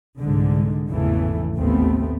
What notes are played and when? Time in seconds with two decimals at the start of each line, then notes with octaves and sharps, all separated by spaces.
0.18 C2 G#2 D3 G#3
0.90 G#1 E2 A2 C#3 E3 A3
1.55 A1 D#2 A3 B3 C4